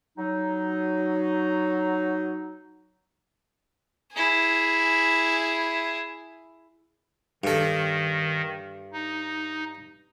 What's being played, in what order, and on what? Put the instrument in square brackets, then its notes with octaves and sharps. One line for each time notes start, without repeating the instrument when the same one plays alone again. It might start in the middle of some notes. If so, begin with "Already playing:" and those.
[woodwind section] F#3 D#4
[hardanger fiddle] E4 G#4
[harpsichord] G2 A4 [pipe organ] D#3
[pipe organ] D#4